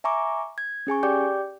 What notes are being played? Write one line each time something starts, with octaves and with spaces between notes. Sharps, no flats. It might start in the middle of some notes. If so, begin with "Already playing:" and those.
E5 G#5 A#5 C#6 D6
G#6
C#4 G#4 G#5 C#6
G4 D5 G5 D6 G6